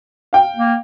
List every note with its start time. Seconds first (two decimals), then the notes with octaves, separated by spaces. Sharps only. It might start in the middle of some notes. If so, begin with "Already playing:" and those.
0.33 F5 G5
0.57 A#3